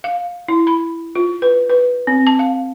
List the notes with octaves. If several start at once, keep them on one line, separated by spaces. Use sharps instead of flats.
F5
E4
B5
F4
B4
B4
C4
A5
F5